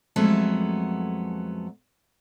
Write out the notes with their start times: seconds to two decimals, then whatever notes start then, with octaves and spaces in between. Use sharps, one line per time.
0.16 F2 F#3 G#3 A3 B3 A5